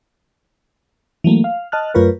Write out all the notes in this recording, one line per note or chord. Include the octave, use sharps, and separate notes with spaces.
E3 F#3 A3 A#3
F5
D#5 A5 F6 F#6
F#2 A3 F4 A#4 B4 C#5